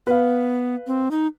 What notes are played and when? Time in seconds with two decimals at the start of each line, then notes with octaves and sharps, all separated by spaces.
0.07 B3 B4 F5
0.87 C4
1.11 D#4